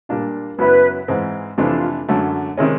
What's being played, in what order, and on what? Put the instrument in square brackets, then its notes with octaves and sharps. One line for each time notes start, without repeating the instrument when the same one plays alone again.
[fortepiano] A#2 G3 A#3 D4 F4
[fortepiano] F#2 C#3 F#3 B3 E4 [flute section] B4
[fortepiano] G#2 E3 G#3 C4
[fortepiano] F2 C3 E3 A3 D4 [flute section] F4
[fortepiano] F#2 D3 F#3 A3
[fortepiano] C3 D#3 G#3 C#4 [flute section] E4